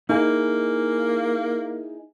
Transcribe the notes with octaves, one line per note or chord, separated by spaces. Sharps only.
A#3 D#4 E4 G#4